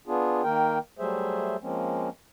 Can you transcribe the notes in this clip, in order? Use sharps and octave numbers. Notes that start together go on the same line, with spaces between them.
B3 D4 F4 G#4
D#3 A#3 A#4 G5
F#3 G3 A3 G#4 C5 E5
F3 G#3 A#3 C4 C#4